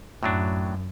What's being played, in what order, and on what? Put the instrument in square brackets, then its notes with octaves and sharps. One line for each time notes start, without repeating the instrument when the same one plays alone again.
[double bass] F#2 [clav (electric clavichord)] A2 F#3 D4